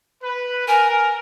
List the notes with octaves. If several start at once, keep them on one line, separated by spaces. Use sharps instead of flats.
B4
A#4 G#5